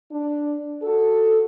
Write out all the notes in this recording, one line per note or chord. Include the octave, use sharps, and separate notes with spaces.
D4
F#4 A4